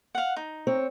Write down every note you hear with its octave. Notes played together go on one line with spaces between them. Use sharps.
F5 F#5
D#4
C4 C#5